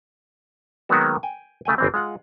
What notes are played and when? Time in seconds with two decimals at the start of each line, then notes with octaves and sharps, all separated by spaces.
0.89 D#3 F#3 G#3 A#3 B3 F#4
1.23 G5 G#5
1.65 C#3 A3 G5 G#5
1.78 G1 E3 C4
1.94 G#3 F4 F#5